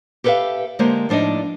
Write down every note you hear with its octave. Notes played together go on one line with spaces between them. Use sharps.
G4 A4 B4 C5 E5 F5
D3 G#3 A#3 G4 C5
A2 F3 D4 D#4 D#5